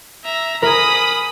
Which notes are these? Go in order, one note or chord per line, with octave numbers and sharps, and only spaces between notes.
E5 A#5
G#4 A#4 B5 D#6